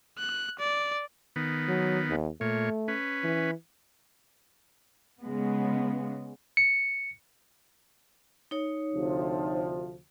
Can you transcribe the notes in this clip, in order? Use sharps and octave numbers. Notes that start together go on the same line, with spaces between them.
F#6
D5
D#3 B3
F#3
D#2
A#2 A3 C#5
C#4 B4
E3
C#3 G#3 B3
C#7
D#4 C#5
D2 C3 F3